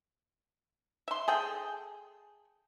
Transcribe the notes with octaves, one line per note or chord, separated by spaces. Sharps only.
E5 C6
G#4 A4 G5